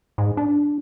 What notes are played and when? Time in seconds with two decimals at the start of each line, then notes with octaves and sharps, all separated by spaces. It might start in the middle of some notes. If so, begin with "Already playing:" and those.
0.18 G#2
0.37 D4